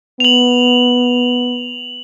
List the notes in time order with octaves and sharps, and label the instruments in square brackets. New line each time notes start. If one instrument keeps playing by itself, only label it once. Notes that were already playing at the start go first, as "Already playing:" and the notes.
[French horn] B3 [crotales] F7 F#7